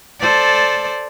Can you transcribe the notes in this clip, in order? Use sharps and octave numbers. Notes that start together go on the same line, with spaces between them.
A4 C5 D5